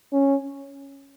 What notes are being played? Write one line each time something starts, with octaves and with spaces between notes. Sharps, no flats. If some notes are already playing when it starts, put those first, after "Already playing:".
C#4